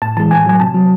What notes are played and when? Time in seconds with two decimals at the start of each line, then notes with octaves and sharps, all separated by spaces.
0.02 A2 A5
0.17 E3 G#3 A5
0.31 A2 G#5
0.46 F#3 G#5
0.60 C3 A5
0.74 F#3